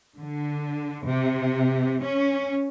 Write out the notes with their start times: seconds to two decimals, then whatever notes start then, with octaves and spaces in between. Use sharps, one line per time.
0.18 D3
1.07 C3
2.03 C#4